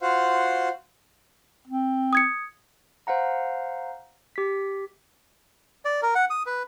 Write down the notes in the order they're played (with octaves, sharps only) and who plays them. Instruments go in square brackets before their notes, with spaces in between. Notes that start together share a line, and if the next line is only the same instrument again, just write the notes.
[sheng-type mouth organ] F4 F#4 C5 F5 F#5
[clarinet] C4
[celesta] D#6 G#6 C#7
[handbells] C5 F5 F#5 A#5
G4 B6
[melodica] D5
A#4
F#5
D#6
B4